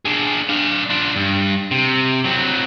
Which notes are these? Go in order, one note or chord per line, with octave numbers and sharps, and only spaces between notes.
D4 G#4
D4 F5
D4 F4
G2
C3
F#3 C4